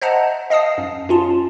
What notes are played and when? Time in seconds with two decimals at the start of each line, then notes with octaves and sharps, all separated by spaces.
0.02 C5 D#5 E5 F#5 A5 A#5
0.50 D#5 F5 A5 D#6 C7
0.78 F#2
1.09 C#4 F4 A5